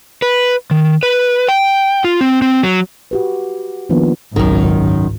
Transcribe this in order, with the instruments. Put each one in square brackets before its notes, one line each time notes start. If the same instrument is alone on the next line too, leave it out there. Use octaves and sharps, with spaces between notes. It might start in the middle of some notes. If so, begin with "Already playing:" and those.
[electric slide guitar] B4
D#3
B4
G5
F4
C4
C4
F#3
[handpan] F#4 G4 B4
D#3 F3 A#3 B3 C#4 D4
[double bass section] G#1 C#2 [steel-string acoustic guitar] F#2 D#3